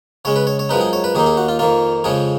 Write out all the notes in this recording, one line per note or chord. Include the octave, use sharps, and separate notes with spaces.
C#3 G#3 C#4 C#5
B4
C#5
C#5
F#2 F3 G#3 D#4 B4
G#4
C#5
B4
D#2 D#3 A#3 D#4 G#4
G#4
F#4
F4
F2 D#3 A#3 F4
F2 C#3 F3 G#3 G#4